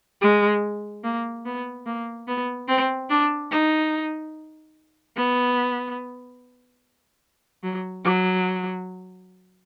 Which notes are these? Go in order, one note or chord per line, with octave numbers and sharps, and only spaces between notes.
G#3
A#3
B3
A#3
B3
C4
D4
D#4
B3
F#3
F#3